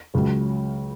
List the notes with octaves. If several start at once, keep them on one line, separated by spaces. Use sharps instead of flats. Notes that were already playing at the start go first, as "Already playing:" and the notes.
C#2 C#3 F#3